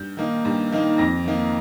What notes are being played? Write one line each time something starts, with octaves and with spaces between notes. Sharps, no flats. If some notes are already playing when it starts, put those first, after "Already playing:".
Already playing: G2 G6
D#3 A#3 D#4
G2
D#3 A#3 D#4
F2 A#6
D#3 A#3 D#4